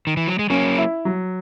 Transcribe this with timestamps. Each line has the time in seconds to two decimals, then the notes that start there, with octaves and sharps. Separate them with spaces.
0.07 D#3
0.17 E3
0.28 F#3
0.39 G#3
0.50 F#3 A#3 C#4
0.78 E4
1.05 F#3